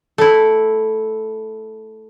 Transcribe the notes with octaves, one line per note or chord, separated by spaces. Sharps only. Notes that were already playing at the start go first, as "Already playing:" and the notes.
A3 E4